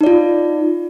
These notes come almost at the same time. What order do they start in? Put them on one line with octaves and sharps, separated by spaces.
D#4 D5 F4